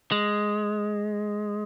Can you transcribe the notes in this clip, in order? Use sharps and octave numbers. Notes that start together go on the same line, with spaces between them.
G#3